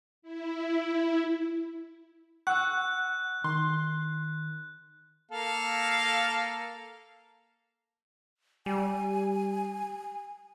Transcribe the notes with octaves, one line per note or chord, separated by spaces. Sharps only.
E4
F#5 C#6 E6 F#6
D#3 C6
A#3 A4 F5
G3 G#5